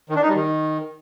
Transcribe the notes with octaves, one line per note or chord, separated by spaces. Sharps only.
D#3
D4
D#4
G3
D#3